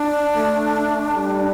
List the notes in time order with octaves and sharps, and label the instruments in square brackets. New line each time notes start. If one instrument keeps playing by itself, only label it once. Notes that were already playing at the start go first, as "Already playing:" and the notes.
Already playing: [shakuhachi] D4
[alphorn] A3
G3